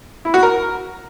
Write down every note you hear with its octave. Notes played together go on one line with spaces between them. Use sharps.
E4
F#4
A#4